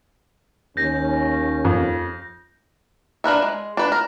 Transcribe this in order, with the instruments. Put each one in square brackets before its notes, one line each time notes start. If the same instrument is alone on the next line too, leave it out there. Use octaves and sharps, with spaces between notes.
[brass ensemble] D#2 C#4 [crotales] G6 A#6
[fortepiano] F2
[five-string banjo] D4 A#4 B4 E5
G#3
D4 B4
A#4